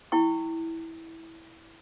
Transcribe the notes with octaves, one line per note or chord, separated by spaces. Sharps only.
E4 G5 C#6